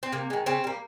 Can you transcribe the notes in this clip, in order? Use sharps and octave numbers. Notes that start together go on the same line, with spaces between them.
C4
C3 A#3
D#3 G#3
C#3 C4
G3 A#3